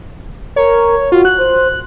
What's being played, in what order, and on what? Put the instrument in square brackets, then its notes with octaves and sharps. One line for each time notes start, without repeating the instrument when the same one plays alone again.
[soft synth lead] A#4 [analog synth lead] C#5
[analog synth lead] F4 [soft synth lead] F#4
[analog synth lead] F#6
[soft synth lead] C5